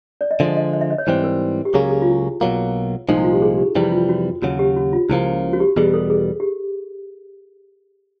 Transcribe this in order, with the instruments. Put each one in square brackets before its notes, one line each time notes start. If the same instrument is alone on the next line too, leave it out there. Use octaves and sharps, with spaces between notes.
[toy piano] D5
D#5
[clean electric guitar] D3 F3 G#3 [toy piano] E5
[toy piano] D#5
D#5
E5
D#5
C#5
[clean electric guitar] G#2 E3 G3 C4 [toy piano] C5
[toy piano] A#4
G4
[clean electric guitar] C#2 C#3 F#3 A#3 C#4 [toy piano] G#4
[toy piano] G#4
F4
E4
[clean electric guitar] B1 B2 F#3 A#3
[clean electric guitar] C2 A#2 F3 G#3 [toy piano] D#4
[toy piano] E4
F4
G4
G#4
G4
[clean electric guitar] F2 C3 E3 G3 [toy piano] E4
[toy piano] F4
F#4
[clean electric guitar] D#2 C#3 F#3 [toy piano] F#4
[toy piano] G4
F#4
F4
[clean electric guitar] C#2 C#3 F3 A#3 [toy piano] E4
[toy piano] F#4
G4
[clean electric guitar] E2 B2 G3 [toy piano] G#4
[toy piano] A4
G#4
G4